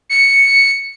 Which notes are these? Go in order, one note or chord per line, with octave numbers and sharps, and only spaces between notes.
C#7